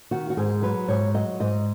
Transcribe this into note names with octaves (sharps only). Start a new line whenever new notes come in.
D#3 F#4
F#4
G#2 G#4
F#3 B4
G#2 C#5
F#3 D#5
G#2 D#5